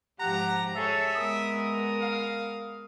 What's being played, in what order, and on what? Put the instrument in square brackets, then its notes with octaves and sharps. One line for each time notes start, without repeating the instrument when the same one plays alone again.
[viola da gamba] G#2 F3 G4 [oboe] F#5 [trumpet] A#5
[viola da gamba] G#4 C#5 [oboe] A4 [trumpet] E5
[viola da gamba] G#3 B3 A#4 [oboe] D#6
[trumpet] F5